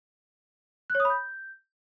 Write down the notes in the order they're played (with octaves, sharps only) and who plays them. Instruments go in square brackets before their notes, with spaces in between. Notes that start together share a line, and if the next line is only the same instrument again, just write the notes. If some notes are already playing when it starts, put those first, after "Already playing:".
[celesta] F#6
C#5
D#6
B5
G6